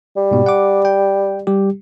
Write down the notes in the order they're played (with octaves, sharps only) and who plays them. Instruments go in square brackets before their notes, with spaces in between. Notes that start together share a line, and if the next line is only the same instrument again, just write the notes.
[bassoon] G3
[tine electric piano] G#2 B2
F#5 D6
G5
G3 G4